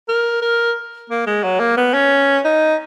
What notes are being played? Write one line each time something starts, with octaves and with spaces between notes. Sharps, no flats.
A#4
A#4
A#3
G#3
F#3
A#3
B3
C#4
D#4